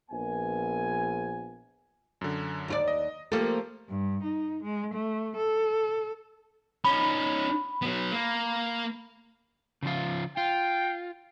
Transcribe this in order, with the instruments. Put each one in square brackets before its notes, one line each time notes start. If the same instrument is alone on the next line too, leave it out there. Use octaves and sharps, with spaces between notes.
[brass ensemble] A#1 B3 G#5
[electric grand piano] F#2 D3
[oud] D#2 F4 D5
[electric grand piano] D#5
[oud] F3 A#3 A4 [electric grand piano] A3 F4 G4
[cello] G2
D#4
G#3
A3
A4
[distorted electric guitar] C#4 D#4 [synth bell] B5
[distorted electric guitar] F#3 B3
A#3
[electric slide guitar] C#3 F3 F4
[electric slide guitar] F4 [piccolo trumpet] G5